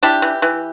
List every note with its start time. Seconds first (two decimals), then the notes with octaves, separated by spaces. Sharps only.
0.03 D4 E4 G4
0.22 E3
0.42 E3